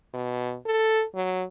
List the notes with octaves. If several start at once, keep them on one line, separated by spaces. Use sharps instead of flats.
B2
A4
F#3